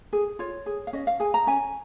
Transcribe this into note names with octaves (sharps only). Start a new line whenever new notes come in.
G#4
F4 C#5
G#4
F5
C#4 D#5
F5
G#4 G#5
A#5
C#4 G#5